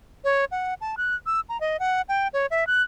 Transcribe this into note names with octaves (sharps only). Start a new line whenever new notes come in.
C#5
F#5
A5
F#6
E6
A#5
D#5
F#5
G5
C#5
E5
F#6